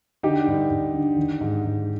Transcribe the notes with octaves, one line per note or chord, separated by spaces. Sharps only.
D3 D#4 G4
G2
G2
D3
D#3
G#2
G#2